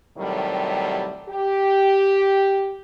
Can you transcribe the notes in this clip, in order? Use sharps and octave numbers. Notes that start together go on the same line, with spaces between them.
A2 C3 D#3 F#3 G3
G4